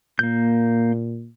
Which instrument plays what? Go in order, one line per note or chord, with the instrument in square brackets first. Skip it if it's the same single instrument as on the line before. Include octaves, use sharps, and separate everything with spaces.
[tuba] A#2 [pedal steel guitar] A#3 G6